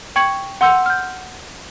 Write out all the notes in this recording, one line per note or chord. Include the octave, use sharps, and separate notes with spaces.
G5 C#6 G#6 C#7 F#7
F#5 C6 E6 G6 C#7
F6 G6